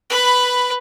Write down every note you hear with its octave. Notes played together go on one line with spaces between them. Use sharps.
B4 B5